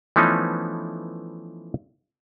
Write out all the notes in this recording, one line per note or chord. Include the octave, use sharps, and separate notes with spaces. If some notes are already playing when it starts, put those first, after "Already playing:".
E3 F3 A3 B3 C#4 D#4